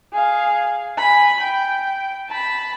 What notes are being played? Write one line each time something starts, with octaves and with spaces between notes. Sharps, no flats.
G#4 F5
G#5 B5
G5
A5 B5